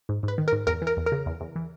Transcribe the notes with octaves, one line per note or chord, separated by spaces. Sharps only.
G#2
G#2 B4
D#3
A#4
G#2
E2 A#4
E3
A#4
E2
A#4
C#3
E2
E2
E3